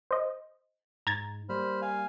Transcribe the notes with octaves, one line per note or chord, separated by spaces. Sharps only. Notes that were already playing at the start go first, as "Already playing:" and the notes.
C5 D#5
G#2 A#5 G#6 A6
G3 A#3 C5 B5 F6
F5 G#5